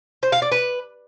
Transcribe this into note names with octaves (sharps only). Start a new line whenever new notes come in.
C5
F5
D5
B4